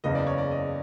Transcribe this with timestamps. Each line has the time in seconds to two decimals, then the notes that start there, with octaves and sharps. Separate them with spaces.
0.04 F#1 E2 C#3 D#5
0.15 D5
0.27 C#5
0.38 D5
0.51 D#5